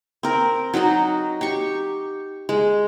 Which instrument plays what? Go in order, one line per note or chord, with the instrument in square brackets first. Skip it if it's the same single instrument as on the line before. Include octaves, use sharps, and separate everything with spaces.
[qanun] C4 A#4
F#3 D#4 F#4 D#5
G4 C#6
G#3